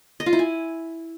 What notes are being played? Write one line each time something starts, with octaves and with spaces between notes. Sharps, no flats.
D#5
F4
E4
G#5